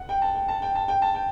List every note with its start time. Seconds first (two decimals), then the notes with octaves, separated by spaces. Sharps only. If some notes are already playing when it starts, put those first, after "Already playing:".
Already playing: F#5
0.09 G5
0.22 A5
0.35 G5
0.48 A5
0.62 G5
0.75 A5
0.88 G5
1.02 A5
1.14 G5